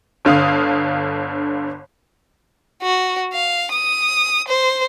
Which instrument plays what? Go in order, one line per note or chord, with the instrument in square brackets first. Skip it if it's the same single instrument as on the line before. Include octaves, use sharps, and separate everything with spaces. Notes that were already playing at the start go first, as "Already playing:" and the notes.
[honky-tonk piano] G1 D3 F5 D#6
[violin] F#4
F5
D#6
C5